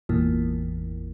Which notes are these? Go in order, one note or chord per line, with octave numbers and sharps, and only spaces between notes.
G#1 E2 A#2